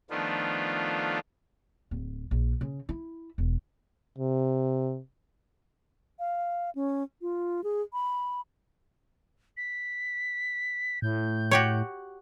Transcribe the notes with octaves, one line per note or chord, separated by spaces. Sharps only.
D#3 F3 A3 B3 D4 F4
D1
A#1
C#3
E4
E1
C3
F5
C#4
F4
G#4
B5
B6
A2 G6
F#4 G4 C#5